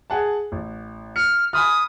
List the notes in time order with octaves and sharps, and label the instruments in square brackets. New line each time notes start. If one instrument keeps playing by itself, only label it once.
[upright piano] G#4 F#5 A5
A1
[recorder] F6 [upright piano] C#7
[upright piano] G#5 B5 F6 [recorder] D#6